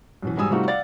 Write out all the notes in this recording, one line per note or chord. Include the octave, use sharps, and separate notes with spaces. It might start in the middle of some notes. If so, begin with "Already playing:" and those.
F#2 B2 E3
G#2 F#3 G3 G#5 D#6 E6
C3 G3 A3 D#4 F4 F#4
D5 F5 F#5 A6